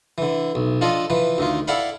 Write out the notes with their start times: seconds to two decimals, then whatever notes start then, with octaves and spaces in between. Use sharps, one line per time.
0.18 D3 E3
0.55 B1
0.81 F3 D4 F4 A4 D#5
1.10 E3 F3 B4
1.38 D2 D#3 F4
1.68 E4 A4 D5 F5 F#5 B5